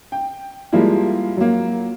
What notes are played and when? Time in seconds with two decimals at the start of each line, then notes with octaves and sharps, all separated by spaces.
0.12 G5
0.73 F3 G3 G#3 A#3 E4
1.37 F#3 A#3